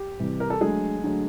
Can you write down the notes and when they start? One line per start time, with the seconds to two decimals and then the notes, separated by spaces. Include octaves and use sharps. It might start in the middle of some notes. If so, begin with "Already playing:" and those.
Already playing: G4
0.20 C3 E3 G3
0.40 A#4
0.50 A4
0.61 D3 F#3 G#3 A3 G#4
1.04 D3 F#3 A3